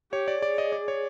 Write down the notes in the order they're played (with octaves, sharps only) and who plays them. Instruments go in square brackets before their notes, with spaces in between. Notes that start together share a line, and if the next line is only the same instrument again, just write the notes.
[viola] G4 [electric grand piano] C#5
[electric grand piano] D5
[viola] G#4 [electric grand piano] D5
[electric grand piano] D#5
D5
C#5